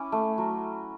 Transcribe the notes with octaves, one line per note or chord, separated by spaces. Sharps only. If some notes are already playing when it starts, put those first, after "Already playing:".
Already playing: C#4 E4 D6
A3
F#3